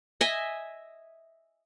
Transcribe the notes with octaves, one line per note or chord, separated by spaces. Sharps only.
D#5 E5 G#5